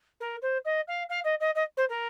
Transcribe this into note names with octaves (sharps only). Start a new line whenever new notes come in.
A#4
C5
D#5
F5
F5
D#5
D#5
D#5
C5
A#4